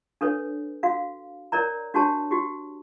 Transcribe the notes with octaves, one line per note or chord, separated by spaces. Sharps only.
D4 A4 B4 C#5
F#4 F5
A#4 C#5 D5 A#5
D4 F#4 G4 C#5 A5
F#4 G4